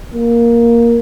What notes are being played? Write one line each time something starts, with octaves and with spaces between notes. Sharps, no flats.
A#3